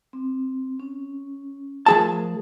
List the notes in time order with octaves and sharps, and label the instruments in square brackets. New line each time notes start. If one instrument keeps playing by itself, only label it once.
[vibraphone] C4
C#4
[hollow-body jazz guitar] F3 G#4 A5 [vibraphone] A3 A#4